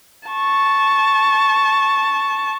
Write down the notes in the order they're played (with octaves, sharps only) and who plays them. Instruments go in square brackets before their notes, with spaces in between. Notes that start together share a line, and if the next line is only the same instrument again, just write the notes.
[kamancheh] A5 C#6